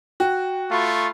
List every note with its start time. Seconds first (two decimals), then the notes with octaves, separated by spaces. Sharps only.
0.20 F#4 G5
0.71 A3 F4 F5 B5 C#6